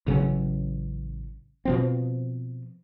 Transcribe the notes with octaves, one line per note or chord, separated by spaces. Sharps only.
A1 C#3 F#3 C#4
B2 F3 C4